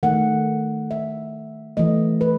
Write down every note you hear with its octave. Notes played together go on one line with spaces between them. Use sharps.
D#3 A3 F#5
E5
E3 A3 D#5
B4